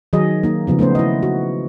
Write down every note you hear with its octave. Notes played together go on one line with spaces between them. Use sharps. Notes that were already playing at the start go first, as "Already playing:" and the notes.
D#3 F#3 G#4 D#5
A#3 D#4
C#3 F3 B3
A3 B3 C#4 C5
E4 D#5
F#4